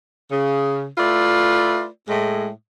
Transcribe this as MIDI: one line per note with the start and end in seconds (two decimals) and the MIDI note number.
0.31 0.86 49
0.98 1.87 57
0.98 1.87 64
0.98 1.87 65
0.98 1.87 71
0.98 1.87 74
2.08 2.49 45
2.08 2.49 56